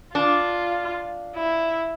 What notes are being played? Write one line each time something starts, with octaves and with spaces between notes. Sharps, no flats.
D4 F4
E4